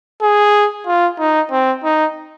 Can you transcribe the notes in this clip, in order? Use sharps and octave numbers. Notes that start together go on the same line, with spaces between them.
G#4
F4
D#4
C4
D#4